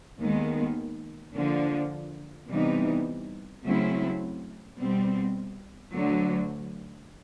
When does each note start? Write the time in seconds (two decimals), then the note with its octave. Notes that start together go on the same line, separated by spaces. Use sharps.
0.19 D#2 D#3 G#3 B3
1.33 D3 F3 A#3 D4
2.48 C3 E3 G3 B3 D#4
3.64 C#3 F#3 A3 C4 E4
4.78 B2 G3 C4
5.93 D2 D3 F#3